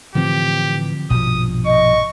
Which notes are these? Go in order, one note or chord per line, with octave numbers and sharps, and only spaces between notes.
A2 D3 E3 F3 C4 G4
A#1 G2 B2 F3 D#6
D#5 C#6